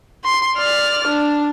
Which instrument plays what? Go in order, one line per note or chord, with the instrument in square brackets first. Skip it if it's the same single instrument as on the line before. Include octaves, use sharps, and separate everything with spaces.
[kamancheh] C6
D5 F6
D4